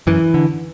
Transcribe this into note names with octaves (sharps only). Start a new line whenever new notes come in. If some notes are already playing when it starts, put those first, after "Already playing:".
F#2 E3
D3